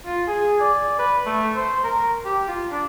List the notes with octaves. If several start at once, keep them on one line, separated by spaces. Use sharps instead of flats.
F4
G#4
D5
B4
A3
C5
A#4
G4
F4
D4